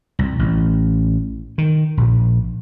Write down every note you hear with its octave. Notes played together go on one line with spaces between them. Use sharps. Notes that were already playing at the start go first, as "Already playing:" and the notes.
C2
A1
D#3
A#1